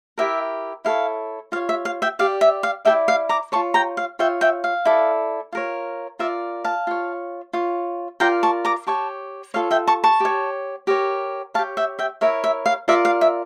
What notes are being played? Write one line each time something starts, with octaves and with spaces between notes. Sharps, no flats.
E4 G4 A#4 E5
E4 A4 C#5 F5
F4 C#5 F5
E5
F5
E5 G5
G4 D5 F5
E5
F5
E4 A4 D5 E5 G5
F5
A#5 D6
F4 A4 C#5 A5 C#6
G5 A#5
F5
F4 C#5 E5 G5
E5 G5
F5
E4 A4 D5
F4 A#4 C#5
F4 A#4 D5 E5
F5 A5
F4 C#5
F4 C#5
F4 A#4 D5 G5 A#5
A5 C#6
A#5 D6
G4 C#5 A5 C#6
F4 A4 C#5 F5
E5 G5
A5 C#6
A5 C#6
G4 C#5
G4 A#4 C#5
G4 C#5 F5 A5
E5 G5
E5 G5
E4 A#4 C#5 E5
E5
F5
F4 A#4 D5 E5
F5
E5